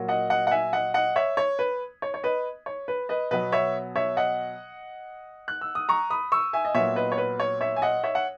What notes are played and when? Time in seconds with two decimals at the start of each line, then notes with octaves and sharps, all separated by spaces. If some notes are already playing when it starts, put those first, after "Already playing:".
Already playing: A#2 F#3 A#3
0.08 D#5 F#5
0.30 D#5 F#5
0.47 F#5
0.51 E5 G#5
0.73 D#5 F#5
0.94 D#5 F#5
1.16 C#5 E5
1.37 C#5
1.59 B4
2.02 C#5
2.14 C#5
2.23 B4 D#5
2.66 C#5
2.88 B4
3.09 B4 D#5
3.31 B2 F#3 B3 B4 D#5
3.52 C#5 E5
3.96 C#5 E5
4.17 D#5 F#5
5.48 F#6
5.61 E6
5.75 D#6
5.89 A#5 C#6
6.10 B5 D#6
6.32 C#6 E6
6.53 E5 G#5
6.65 D#5
6.74 A#2 F#3 B3 C#5 E5
6.96 B4 D#5
7.12 C#5
7.18 B4
7.40 C#5
7.61 C#5 E5
7.76 G#5
7.82 D#5 F#5
8.03 C#5 E5
8.15 F#5